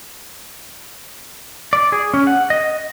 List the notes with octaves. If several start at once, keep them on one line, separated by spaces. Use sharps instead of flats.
D5
G#4
C#4
F#5
D#5